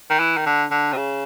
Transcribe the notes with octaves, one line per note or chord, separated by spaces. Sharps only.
D#3
E3
D#3
D3
D3
C3
C#3